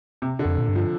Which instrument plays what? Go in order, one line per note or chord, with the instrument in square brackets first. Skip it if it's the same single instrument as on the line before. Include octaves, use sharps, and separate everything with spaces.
[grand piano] C3
D3
[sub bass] F2
A#2
G2
[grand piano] F3